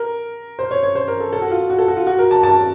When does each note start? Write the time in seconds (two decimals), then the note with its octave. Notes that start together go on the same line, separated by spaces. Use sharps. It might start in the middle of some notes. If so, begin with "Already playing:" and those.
Already playing: A#4
0.59 C5
0.71 C#5
0.83 C#5
0.95 C5
1.08 A#4
1.20 A4
1.33 A4
1.42 F#4
1.51 F4
1.70 F#4
1.79 A4
1.88 F#4
1.97 F4
2.07 F#4
2.19 A#4
2.31 A5
2.43 A5